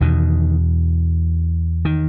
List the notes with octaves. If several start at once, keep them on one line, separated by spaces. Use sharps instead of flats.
E2 B2 D#3
D#3